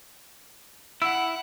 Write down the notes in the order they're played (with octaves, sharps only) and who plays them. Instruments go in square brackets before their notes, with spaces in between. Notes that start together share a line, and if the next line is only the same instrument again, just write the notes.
[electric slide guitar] E4 [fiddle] F#5 [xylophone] E6